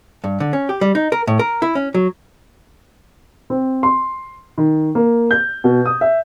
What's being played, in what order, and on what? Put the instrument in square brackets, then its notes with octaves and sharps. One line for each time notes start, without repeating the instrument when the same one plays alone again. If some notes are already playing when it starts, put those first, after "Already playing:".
[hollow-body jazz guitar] G2
D3
C#4
G4
G3
D#4
A#4
A2
A#4
E4
C#4
F#3
[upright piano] C4
C6
D#3
A#3
G6
B2
D#6
E5